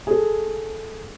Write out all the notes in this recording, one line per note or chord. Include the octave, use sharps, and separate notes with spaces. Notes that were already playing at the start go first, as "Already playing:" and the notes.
G#4 A4